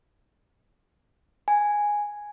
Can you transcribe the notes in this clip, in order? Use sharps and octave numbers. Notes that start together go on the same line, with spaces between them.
G#5